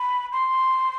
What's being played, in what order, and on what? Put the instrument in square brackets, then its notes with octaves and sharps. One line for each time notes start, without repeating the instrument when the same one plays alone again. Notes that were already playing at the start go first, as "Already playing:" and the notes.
Already playing: [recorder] B5
C6